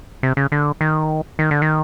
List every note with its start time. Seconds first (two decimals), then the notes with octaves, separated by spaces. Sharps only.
0.23 C3
0.37 C#3
0.52 D3
0.81 D#3
1.39 D#3
1.51 D3
1.62 D#3